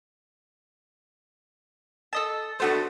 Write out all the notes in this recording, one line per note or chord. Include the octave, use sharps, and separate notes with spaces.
A4 D#5 A5
A3 B3 D4 F#4 A4 C5 C#6